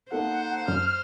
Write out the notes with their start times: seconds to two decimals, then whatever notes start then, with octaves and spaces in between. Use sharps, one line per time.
0.12 A#3 D#4 A4 C5 F#5
0.68 F#2 F6